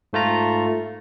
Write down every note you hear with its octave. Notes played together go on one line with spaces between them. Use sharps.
G#2 A3 F4 A#5